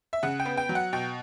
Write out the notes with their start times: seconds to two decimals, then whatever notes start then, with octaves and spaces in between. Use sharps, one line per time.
0.13 E5
0.23 C#3 F#5
0.40 G5
0.45 B3
0.57 G5
0.69 F#3
0.75 F#5
0.93 B2 G5